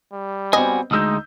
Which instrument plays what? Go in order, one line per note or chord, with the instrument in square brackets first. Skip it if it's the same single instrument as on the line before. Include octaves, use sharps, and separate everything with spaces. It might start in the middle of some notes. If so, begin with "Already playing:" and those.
[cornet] G3
[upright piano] B3 C4 [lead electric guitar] F#4 G#5 [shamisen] D#5
[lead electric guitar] D2 G#3 [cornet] D#4 [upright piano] D#6 E6 G6